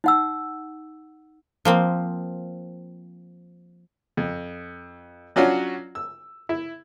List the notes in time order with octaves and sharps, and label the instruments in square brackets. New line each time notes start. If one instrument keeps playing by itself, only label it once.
[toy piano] D#4 F#5 E6
[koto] F3 A#3 C4
[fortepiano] F2
F#3 C#4 D4 F4 F#4
E6
E4